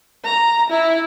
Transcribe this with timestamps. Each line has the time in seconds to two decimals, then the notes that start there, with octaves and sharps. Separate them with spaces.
0.25 A#5
0.70 E4